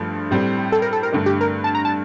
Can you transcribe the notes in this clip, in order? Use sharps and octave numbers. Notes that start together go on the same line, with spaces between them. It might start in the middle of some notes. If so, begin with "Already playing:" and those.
Already playing: G2 F3 A3
A2 G3 C4
A4
A#4
A4
A#4
G2 D3 A3
G4
A#4
A5
A#5
A5